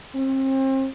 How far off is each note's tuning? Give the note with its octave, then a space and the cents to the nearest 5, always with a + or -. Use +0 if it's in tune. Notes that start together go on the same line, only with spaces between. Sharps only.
C4 +35